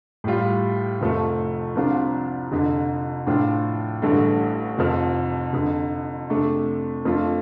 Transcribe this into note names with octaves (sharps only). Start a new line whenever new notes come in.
A2 G3 F4
F1 F2 F3 A3
C2 C3 F3 D4 F4
F1 F2 D3
A2 F3 D4 F4
A1 G2 D3 A3
F1 F2 F3
F1 F2 D3
F2 C3 A3 D4
F2 F3 A3 D4 F4